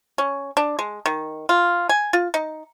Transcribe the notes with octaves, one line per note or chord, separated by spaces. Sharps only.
C#4
D4
G#3
D#3
F4
G#5
F4
D#4